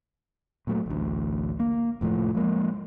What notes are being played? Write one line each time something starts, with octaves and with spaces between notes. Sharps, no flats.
A#2 F#3 A3
A1 D2
A#3
F1 A2 F3 A3
F3 G#3 A#3